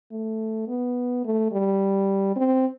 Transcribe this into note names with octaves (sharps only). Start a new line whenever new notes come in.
A3
B3
A3
G3
C4